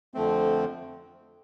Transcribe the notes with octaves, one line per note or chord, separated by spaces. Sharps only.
F2 D3 F3 A3 C4